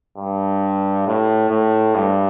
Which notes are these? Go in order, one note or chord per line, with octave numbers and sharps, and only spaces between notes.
G2
A2
A2
G2